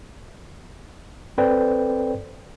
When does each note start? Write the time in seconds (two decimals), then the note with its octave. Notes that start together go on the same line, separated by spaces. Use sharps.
1.38 C4 A4 B4 C5 D5 G5